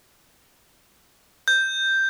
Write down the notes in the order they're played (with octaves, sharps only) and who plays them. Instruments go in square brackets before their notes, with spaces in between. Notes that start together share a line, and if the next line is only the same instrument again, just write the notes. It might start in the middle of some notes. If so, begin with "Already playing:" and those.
[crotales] G6